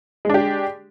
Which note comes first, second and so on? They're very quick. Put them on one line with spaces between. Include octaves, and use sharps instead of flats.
G#3 D4 G4